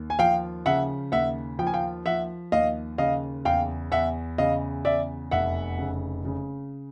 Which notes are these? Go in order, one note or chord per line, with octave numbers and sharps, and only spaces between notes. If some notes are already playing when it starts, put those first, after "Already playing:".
Already playing: D#2
G#5
F3 F5 G5
C#3 E5 F#5
D#2 E5 F#5
F3 G5
G#5
F5 G5
F3 E5 F#5
D#2 D#5 F5
C#3 D#5 F5
E2 F5 G5
E2 E5 F#5
C#3 D#5 F5
E2 D5 E5
F1 E5 F#5
C#3
C#3